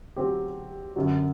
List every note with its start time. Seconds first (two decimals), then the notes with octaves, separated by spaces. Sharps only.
0.16 F#3 C4 G4
0.96 F#2 D3 F#3